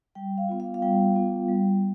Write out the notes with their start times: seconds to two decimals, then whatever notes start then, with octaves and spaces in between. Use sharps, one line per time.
0.15 G3 G5
0.38 F5
0.49 B3 F4
0.60 F5
0.74 F5
0.82 G3 G5
1.16 B3 F4
1.49 G3